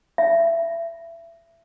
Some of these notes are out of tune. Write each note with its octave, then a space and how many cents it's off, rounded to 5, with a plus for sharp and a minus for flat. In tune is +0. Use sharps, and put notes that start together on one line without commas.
E5 +25